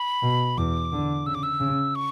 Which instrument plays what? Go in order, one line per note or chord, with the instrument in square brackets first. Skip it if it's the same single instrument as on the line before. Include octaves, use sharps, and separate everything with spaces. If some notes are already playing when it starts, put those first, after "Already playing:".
Already playing: [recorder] B5
[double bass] B2
[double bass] E2 [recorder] D6
[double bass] D3
[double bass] C#3 [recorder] E6
[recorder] D6
E6
[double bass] C#3
[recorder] C#6